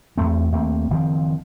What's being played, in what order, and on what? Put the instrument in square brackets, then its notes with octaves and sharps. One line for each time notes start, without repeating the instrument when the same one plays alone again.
[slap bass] E2 G#2 A3 C4
D#2 A3 A#3 C4
F#1 D#3 F3 C4